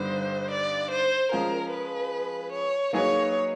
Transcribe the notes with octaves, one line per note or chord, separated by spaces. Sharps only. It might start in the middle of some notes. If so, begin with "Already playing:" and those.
Already playing: G2 D3 G3 B3 D#4 C5
D5
C5
F3 G#3 C#4 F4 G#4 A#4
B4
C#5
F#3 A#3 D#4 G#4 B4 C#5